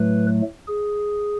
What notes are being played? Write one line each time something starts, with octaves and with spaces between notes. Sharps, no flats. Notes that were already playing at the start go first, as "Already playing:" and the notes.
Already playing: A2 F#3 A3 B4
G#4